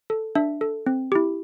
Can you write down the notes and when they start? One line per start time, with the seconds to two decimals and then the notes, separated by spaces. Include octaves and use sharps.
0.10 A4
0.35 D4 E5
0.61 A4
0.86 C4
1.12 E4 G4